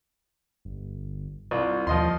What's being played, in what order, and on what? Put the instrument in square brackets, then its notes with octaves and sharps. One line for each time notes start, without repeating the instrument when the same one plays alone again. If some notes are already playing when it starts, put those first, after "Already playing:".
[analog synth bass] G1
[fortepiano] C2 [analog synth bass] F4
[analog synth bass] D#2 [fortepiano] F3 D#5 C6